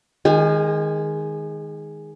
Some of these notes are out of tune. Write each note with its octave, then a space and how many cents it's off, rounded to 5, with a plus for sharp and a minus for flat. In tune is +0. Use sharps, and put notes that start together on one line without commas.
D#3 +0 G#3 +0 G#4 -45